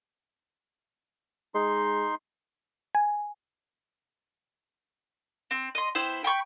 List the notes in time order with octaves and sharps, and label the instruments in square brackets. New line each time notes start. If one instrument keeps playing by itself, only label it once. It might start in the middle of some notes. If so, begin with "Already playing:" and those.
[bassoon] G#3 [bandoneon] D#4 C6
[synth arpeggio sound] G#5
[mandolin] C4
D#5 C6
B3 E4 C5 G5
G5 B5 C#6 G6